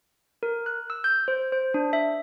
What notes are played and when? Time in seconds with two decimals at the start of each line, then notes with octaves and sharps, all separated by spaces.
0.43 A#4
0.66 F#6
0.90 E6
1.04 G6
1.28 C5
1.52 C5
1.74 D4
1.93 E5